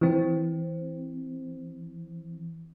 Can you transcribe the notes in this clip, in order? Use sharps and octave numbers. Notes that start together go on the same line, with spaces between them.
E3 C4